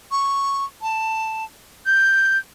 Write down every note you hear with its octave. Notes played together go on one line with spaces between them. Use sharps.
C#6
A5
G6